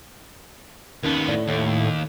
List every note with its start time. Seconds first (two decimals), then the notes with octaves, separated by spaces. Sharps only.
1.03 D#2 B3 C#4 D#4 A#4
1.28 A2 D5
1.48 D#2